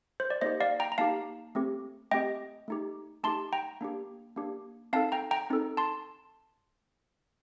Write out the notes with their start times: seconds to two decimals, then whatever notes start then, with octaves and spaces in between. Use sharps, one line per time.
0.20 C5
0.30 D5
0.41 A#3 D#4 G4 C5 D#5
0.60 D5 F5
0.80 G5 A#5
0.92 A#5
0.98 A#3 D#4 G4 F5 A5
1.55 A3 C4 G4
2.11 A3 C4 G4 D#5 G5
2.68 A3 D#4 G4
3.23 A3 D#4 G4 A5 C6
3.53 G5 A#5
3.81 A#3 D4 G4
4.36 A#3 D4 G4
4.93 C4 D#4 A4 F5 A5
5.12 G5 A#5
5.31 G5 A#5
5.50 C4 D#4 A4
5.77 A5 C6